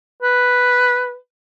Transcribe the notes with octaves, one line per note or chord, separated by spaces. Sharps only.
B4